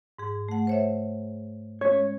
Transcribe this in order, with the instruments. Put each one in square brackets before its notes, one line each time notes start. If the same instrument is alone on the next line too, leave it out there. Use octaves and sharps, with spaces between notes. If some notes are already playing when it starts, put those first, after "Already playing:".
[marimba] G#2 G#4
A3 F#5
C5 C#5 E5
[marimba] G#3 C#4 [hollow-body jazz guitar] C#5